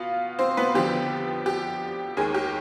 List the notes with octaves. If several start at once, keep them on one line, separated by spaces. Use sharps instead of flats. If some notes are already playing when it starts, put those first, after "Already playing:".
Already playing: B2 B3 F4 F5
C4 C5
B3 B4
F2 D3 F3 B3 G4
G4
D#2 D#3 G#3 G#4
G4